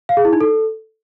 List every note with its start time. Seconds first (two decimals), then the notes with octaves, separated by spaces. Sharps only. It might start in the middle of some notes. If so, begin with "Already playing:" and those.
0.09 F5
0.17 G#4
0.25 E4
0.33 D#4
0.41 A4